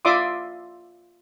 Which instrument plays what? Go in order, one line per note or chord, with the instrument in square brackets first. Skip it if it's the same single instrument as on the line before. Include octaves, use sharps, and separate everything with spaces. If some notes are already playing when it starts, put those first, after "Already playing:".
[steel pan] F4 D5 E5 C6 D6 D#6